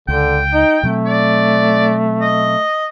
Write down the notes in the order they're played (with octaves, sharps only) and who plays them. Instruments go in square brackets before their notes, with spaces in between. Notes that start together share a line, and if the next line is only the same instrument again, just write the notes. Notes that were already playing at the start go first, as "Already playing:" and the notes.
[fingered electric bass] C#2 [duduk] D3 [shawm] G5
[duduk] D#4
[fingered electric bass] B2 F#3 C4 [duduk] A3
[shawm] D5
D#5